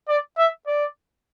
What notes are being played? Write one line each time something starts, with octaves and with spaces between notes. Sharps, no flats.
D5
E5
D5